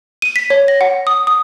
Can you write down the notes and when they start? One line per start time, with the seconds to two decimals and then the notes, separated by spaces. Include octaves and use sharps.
0.22 D#7
0.36 B6
0.50 C#5
0.68 A#6
0.81 F#5
1.07 D#6
1.27 D#6